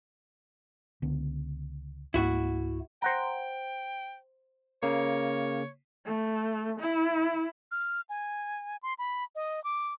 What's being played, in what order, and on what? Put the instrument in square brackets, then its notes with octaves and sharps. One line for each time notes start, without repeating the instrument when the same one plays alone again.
[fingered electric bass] C#2 D3 B3
[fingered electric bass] C#2 G#2 A#3 [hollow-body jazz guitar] E4 F#4
[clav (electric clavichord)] C5 F#5 A#5 [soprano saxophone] G5
[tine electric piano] C#3 A#3 [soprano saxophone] C#5
[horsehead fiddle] A3
E4
[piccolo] F6
G#5
C6
B5
D#5
D6